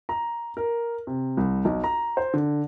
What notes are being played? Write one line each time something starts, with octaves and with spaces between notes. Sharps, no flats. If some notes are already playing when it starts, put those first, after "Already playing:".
A#5
A#4
C3
C2
B1
A#5
C5
D3